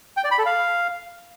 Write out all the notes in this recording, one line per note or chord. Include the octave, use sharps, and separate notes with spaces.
G5
D5
B5
A4
F5